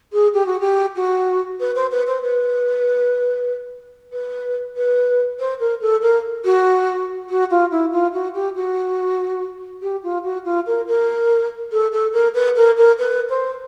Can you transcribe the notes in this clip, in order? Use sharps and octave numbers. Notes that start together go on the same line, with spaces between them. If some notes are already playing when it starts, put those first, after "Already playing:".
G#4
G4
F#4
G4
F#4
B4
C5
B4
C5
B4
B4
B4
C5
A#4
A4
A#4
F#4
F#4
F4
E4
F4
F#4
G4
F#4
G4
F4
F#4
F4
A#4
A#4
A4
A4
A#4
B4
A#4
A#4
B4
C5